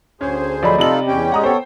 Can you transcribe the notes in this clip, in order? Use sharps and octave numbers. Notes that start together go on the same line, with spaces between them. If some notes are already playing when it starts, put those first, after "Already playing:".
D2 C#4 G#4 C5
F3 F#3 A3 D5 D#5 B5
C3 D#4 F4 A4 F#7
E2 C#4 G4 G5
G#3 F#5 A#5 D#6
B3 A4 C5 C#5 G5